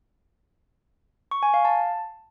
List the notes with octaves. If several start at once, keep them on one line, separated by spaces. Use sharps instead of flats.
C#6
G#5
F5
A5